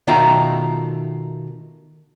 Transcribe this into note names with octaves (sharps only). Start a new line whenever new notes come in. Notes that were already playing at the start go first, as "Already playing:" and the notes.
B2 D#3 A3 F4 E5 A#5